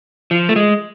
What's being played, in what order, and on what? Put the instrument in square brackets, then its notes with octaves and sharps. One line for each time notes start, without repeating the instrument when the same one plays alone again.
[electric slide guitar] F3
A3
G#3